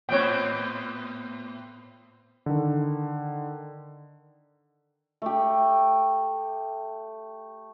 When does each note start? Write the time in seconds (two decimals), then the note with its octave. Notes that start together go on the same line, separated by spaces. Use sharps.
0.09 A2 B3 C4 C#5 G5
2.46 D3 D#3
5.22 A3 G4